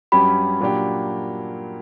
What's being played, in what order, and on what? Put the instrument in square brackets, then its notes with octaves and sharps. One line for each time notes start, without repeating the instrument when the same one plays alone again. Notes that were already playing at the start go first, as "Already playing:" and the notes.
[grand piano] G2 F#3 C#4 G4 [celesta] B5
[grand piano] A#2 F#3 A#3 D4 G4